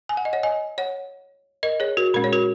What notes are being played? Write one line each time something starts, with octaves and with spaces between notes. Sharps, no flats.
G#5
F#5
D#5
C#5 F#5
D#5 G#5
C#5 F#5
A#4 D#5
G#4 C#5
F#4 A#4
A#2 G#3 C#4 A#4
C#5
F#4 A#4